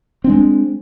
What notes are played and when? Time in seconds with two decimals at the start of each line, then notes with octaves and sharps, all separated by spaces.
0.24 C4
0.27 D4
0.29 G#3